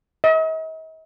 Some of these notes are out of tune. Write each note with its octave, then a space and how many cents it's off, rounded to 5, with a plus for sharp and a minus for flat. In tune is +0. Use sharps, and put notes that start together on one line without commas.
D#5 +45